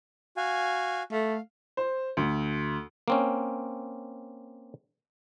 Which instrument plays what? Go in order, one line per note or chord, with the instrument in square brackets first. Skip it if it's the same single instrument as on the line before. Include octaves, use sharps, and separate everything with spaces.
[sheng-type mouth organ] F#4 F5 G#5
[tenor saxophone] A3 [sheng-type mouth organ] F5
[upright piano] C5
D2
[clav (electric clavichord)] A#3 C4 C#4